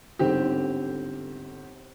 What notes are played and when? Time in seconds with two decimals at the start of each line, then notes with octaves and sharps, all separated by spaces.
0.19 G1 G#2 D3 C4 G4